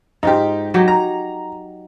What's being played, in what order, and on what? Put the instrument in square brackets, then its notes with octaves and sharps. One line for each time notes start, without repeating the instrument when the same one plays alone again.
[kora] G#2 F4 [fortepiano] D#4 G4
[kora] F#3 D#4 G4
[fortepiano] A#5